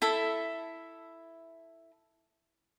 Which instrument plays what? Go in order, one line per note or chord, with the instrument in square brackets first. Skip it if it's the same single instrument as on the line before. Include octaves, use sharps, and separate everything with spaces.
[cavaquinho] E4 A4 E5